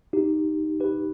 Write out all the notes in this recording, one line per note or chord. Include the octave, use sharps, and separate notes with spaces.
D#4 G4
G4 B4